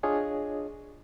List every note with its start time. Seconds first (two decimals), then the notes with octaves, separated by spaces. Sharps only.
0.03 D4 F4 G#4 C#5 D#5